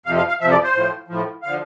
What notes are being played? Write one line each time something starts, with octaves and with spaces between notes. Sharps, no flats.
F2 C3 F3 F5
F5
F5
F2 C3 F3 E5
D5
C5
A2 F3
A2 F3
D3 F3 F5